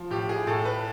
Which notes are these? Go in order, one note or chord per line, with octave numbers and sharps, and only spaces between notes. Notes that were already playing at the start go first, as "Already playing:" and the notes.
Already playing: F3
A2 G4
G#4
A2 A4
B4